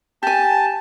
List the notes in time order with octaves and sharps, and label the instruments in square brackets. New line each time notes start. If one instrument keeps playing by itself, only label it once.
[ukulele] G4 G#5 [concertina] A5